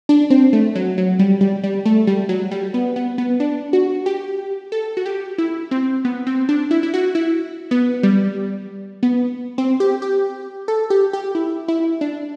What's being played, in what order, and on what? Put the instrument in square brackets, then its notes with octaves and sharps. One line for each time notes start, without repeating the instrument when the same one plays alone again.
[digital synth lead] D4
C4
A3
F#3
F#3
G3
G3
G3
A3
G3
F#3
G3
B3
B3
B3
D4
F#4
G4
A4
F#4
G4
E4
C4
B3
C4
D4
E4
E4
F#4
E4
B3
G3
B3
C4
G4
G4
A4
G4
G4
E4
E4
D4